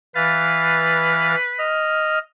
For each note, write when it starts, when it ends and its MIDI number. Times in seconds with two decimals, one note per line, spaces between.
0.15 1.35 52
0.15 1.72 71
0.15 1.35 77
0.15 1.35 93
1.58 2.19 75
1.58 2.19 89